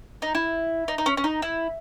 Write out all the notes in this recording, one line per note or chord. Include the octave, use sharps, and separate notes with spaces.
D#4
E4
D#4
D#4
C#4
C#4
D#4
E4